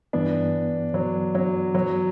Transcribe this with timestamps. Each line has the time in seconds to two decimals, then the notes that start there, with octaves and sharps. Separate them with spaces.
0.13 G2 E3 B3 D4
0.94 F#3
1.35 F#3
1.75 F#3